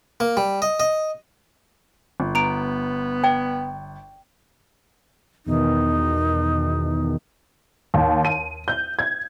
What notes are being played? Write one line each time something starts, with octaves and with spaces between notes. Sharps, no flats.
A#3
G3
D#5
D#5
G1
B3 A#5 D7
D5 G5
E2 B2 D#3 D#4
D#2
D#7
G6
G#6